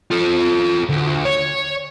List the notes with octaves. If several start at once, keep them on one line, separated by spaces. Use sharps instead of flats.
F4 A4
D2
C#5